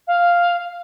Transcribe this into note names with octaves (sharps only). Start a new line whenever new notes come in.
F5